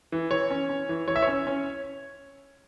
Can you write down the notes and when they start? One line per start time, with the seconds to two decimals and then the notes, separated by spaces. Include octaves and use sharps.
0.12 E3
0.31 E3 C#5
0.50 C#4
0.69 C#4
0.89 E3
1.08 E3 C#5
1.16 E5
1.22 C#5
1.27 C#4
1.47 C#4